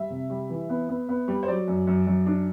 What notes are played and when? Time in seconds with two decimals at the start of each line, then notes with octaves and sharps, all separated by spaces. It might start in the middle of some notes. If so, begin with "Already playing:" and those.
Already playing: G3 E5
0.10 C3
0.30 G3
0.49 E3
0.69 B3
0.89 B3
1.09 B3
1.28 G3
1.43 C5
1.48 F#3 D5
1.68 F#2
1.87 F#2
2.07 F#2
2.26 D4